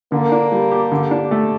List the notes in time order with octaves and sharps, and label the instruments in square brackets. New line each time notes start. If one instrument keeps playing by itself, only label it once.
[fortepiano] D3 [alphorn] A#3
[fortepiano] D4
G3
G4
D3
D4
A3